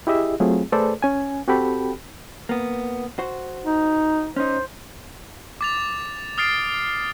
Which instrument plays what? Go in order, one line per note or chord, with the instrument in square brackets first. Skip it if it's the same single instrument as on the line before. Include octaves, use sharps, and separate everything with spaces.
[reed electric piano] E4 G4 G#4 D#5 E5
F#3 A3 C4 F4 G#4
A3 G#4 A4 B4 C5 D5
C#4 G#5
C4 F#4 G4 A4 G5 B5
[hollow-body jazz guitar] A#3 B3
F#4 C5
[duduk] D#4
[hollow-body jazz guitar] C#4 D#4 [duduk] C5
[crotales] D6 A6 F7
D#6 F6 A6 C7 D7